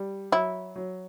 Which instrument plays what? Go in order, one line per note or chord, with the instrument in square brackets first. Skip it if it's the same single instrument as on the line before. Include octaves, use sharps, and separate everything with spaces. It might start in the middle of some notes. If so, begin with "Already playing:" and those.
Already playing: [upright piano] G3
[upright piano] F#3 [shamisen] E4
[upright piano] F#3